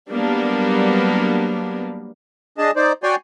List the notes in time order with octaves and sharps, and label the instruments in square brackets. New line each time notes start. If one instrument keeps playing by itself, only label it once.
[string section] F#3 G3 A#3 B3 D4
[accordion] D4 G#4 D#5 A5
D#4 C5 D5
F#4 C#5 D5 G5 G#5 C6